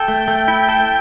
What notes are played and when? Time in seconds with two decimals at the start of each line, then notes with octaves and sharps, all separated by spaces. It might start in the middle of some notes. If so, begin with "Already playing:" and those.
Already playing: A4 G5
0.08 A3
0.28 A3
0.48 E4
0.69 A4